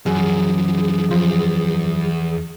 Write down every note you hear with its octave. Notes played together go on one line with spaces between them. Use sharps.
F#2 E3 F3 G#4
E2 F3